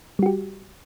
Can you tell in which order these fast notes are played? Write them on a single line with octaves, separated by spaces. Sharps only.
G3 F#4 G4